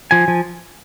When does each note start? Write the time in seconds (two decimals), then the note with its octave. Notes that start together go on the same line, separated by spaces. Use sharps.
0.11 F3 G#5
0.28 F3